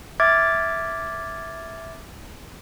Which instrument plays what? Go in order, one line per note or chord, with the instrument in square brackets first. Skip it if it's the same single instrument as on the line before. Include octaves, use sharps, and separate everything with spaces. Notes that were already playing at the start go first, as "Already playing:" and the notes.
[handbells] E5 D6 F6 G#6 A6